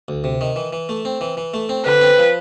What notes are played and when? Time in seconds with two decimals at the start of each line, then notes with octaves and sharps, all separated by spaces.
0.08 D2
0.24 C3
0.41 D#3
0.56 E3
0.73 E3
0.89 A3
1.05 C4
1.21 E3
1.37 E3
1.54 A3
1.69 C4
1.86 D3 B4
2.01 C4
2.18 F3